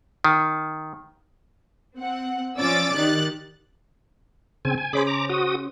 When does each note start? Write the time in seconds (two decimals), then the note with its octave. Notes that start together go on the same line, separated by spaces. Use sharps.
0.24 D#3
1.96 C4 F#5
2.58 F3 C#4 D5 D6 E6 A6
2.95 D#3 G4 F#6 A6
4.65 C#3 C4 G#5
4.78 G#5
4.93 C#3 C#4 G#4 C5 B5 D6
5.07 A#5 D6
5.29 F#4 D#6